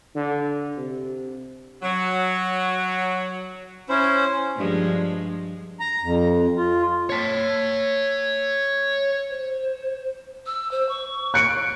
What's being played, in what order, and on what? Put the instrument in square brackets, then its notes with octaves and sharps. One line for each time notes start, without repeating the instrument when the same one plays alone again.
[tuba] D3
C3
[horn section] F#3
[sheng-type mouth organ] C#4 C5 [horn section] E4
[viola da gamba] G2 F3 G#3
[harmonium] A#5
F2
F4
[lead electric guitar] C#5 A5
[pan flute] C5
E6
C5
C#6
[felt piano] F#6 C#7 D7